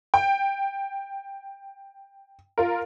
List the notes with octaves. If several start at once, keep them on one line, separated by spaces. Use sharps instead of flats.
G5
F4 A#4